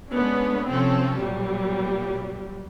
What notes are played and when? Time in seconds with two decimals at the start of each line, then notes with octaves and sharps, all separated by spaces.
0.13 G#3 A3 B3 C#4 D4
0.71 C3 F3 C4 C#4 F4 A4
1.20 B1 A#2 F#3 G3